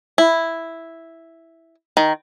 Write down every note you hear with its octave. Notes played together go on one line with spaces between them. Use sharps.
E4
D#3